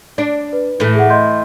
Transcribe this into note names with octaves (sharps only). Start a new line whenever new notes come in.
D4
B4
A2 E3 A3
G#4 F#5
D#5 C6 G6